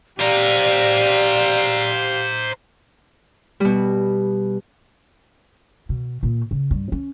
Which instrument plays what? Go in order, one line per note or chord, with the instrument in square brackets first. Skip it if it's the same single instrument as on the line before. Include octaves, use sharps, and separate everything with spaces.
[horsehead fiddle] G4 F5 [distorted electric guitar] C5 A#5 [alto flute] D5
[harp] B2 G3
[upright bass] B2
A#2
C#3
G2
C#4